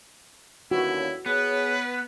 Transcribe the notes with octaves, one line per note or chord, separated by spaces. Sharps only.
D#2 D3 C#4 E4 F#4
B3 G#4 B4 C#5